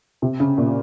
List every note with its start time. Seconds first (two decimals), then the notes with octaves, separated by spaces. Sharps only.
0.22 C3
0.40 C#3
0.58 A#2